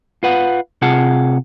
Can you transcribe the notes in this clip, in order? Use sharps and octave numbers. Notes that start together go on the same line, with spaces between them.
F4 B4 F#5
C3 F4 G#4 F#5 A5